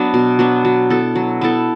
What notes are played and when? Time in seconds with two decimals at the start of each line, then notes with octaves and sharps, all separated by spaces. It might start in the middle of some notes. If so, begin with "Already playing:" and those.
Already playing: F#3 B3 D4
0.14 B2
0.39 F#3 B3 D4
0.65 F#3
0.90 B3 E4 A4
1.15 F#3
1.41 B3 E4 A4